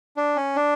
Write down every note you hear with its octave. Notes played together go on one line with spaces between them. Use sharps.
D4
C#4
D4